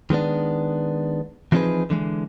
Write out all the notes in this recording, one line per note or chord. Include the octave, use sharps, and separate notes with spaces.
D#3 G#3 B3 D4
E3 F3 C4 D#4 G#4 B4
D3 E3 G#3